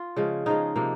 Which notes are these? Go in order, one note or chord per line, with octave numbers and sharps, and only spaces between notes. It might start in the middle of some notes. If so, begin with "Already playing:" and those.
Already playing: F4
C#3 F3 G#3
C#3 F3 G#3 D#4
C3 F3 A#3